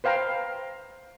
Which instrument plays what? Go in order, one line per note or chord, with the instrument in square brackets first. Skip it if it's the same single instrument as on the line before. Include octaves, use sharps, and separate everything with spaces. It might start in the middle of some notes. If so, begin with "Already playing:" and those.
[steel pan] B4 C5 F5 G5 A#5